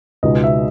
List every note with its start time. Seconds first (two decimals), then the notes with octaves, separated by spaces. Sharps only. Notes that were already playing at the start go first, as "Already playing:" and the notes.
0.23 C#2 B2 G#3 B3 D#4 D#5
0.44 E5